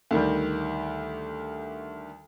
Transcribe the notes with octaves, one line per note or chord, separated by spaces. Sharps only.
D2 D#3 G3